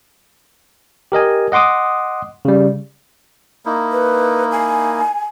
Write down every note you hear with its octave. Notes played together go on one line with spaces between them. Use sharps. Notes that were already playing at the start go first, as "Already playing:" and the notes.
G4 A#4 D#5 G#5
D#5 F#5 C6 D6 D#6
C#3 G3
A#3 D#4 E4
B4
G#5